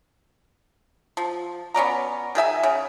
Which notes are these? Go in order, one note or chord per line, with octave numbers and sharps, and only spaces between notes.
F3
B3 C#4 D5 A#5
D#3 G#4 E5 G#5
C#3